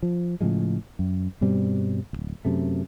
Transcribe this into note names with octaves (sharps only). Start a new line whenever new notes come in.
F3
A2 C#3 F3 G#3
F#2
G2 B2 G3 C4
D1 C#2
F#2 C3 A3